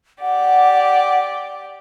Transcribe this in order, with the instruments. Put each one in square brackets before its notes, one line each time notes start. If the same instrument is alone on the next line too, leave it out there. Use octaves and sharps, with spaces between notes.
[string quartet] G4 D5 [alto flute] F#5